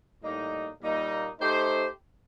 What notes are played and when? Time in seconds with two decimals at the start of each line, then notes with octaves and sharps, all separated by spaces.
0.23 A2 G3 A#3 D#4
0.82 A#2 G3 A#3 D#4
1.40 A3 D#4 G4 C5